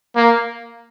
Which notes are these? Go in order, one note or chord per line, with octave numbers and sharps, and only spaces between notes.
A#3